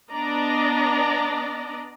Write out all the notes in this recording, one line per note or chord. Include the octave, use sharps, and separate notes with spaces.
B3 D4 D5 D#5 A#5